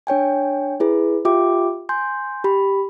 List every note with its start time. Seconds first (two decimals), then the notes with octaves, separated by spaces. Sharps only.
0.07 D4 C#5 G5 G#5
0.80 E4 G#4 B4
1.25 F4 G4 E5 G5 D6
1.89 G#5 C6 G6
2.44 G4 B5